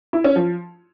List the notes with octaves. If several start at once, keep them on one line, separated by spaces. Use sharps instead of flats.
E4
C#4
F3